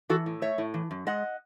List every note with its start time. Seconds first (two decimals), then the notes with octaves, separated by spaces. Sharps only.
0.10 E3 F#4 A4
0.26 A2
0.42 A3 C#5 E5
0.58 A2
0.74 E3
0.91 F#2
1.07 G#3 D#5 F#5